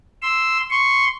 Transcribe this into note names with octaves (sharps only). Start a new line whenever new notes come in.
C6 E6
C6 C#6